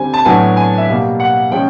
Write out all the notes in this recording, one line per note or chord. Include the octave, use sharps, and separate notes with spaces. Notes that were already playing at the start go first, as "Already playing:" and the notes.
Already playing: D3 G3 C4 G#5
A5
A2 F#3 B3 D4 G#5
G#5
E5
B2 G3 A#3 F5
F#5
F3 G#3 C#4 G5